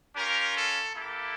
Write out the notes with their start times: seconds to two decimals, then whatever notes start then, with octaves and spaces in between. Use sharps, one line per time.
0.16 C#4 F4 G4 A#4
0.57 A4
0.96 A#3 E4 G4 A4